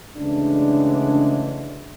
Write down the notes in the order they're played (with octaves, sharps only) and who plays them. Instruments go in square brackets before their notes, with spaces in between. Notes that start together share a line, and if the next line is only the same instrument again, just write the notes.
[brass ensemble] D2 C#3 E3 F#3 G#3 D4